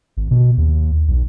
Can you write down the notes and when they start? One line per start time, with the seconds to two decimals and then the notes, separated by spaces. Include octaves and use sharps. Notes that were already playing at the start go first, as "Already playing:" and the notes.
0.17 G#1
0.31 B2
0.58 D#2
1.08 B1